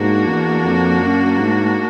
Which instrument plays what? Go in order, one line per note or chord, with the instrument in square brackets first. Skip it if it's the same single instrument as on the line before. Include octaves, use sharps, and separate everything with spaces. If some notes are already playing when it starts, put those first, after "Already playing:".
Already playing: [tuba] G#2 [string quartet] A#3 D4 F#4 A#4
[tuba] E2
F2
F#2
G#2